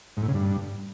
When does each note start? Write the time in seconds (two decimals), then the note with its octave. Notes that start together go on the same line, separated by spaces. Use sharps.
0.17 G#2
0.23 A2
0.28 C#3
0.34 G2